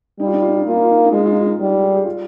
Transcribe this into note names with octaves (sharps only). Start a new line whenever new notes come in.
G3 D#4
F4
D#4
F4
D#4
F4
D#4
A#3 F4
D#4
F4
D#4
F4
D#4
G#3 F4
D#4
F4
D#4
F4
D#4
G3
G#4
G4
F4